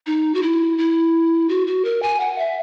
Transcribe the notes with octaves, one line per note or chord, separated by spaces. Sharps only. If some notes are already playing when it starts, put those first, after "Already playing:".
D#4
F#4
E4
E4
F#4
F#4
A#4
G#5
F#5
E5